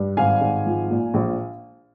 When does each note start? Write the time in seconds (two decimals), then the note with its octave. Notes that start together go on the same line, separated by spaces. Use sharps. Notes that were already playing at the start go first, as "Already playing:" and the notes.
Already playing: G2
0.17 G#1 F5 G#5
0.41 G#1
0.66 F3
0.91 A#2
1.14 A#1